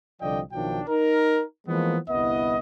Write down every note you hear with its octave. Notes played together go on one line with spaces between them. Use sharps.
C2 D3 F3 D5 D#5 G5
B1 D#3 F3 F#3 D4 G5
D#4 A#4
E3 F3 G#3 A#3 B3
G1 C2 B3 E4 D#5